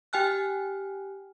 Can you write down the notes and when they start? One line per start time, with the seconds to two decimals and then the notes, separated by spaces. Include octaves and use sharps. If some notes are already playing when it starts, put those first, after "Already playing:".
0.13 G4 G5 G#5 F6 F#6